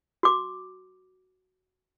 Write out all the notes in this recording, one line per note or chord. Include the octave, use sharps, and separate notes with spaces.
F#4 D6